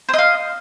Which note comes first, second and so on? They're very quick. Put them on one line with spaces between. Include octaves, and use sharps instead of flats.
C5 D#5 F5